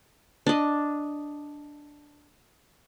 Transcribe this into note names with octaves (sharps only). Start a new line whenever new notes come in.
D4 D#5